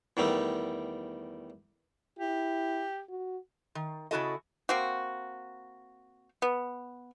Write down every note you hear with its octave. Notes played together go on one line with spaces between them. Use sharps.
E2 D#3 G3 A3
E4 G4
F#4
D#3
C#3 E4 F#4 A4 D#5
A#3 C4 F#4
B3